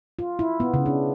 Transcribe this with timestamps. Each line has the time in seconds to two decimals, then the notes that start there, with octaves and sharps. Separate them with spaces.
0.19 F4
0.39 E4
0.60 B3
0.74 C#3
0.86 D4